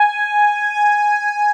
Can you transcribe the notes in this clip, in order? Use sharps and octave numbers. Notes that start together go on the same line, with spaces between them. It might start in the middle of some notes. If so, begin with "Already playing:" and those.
Already playing: G#5
G#5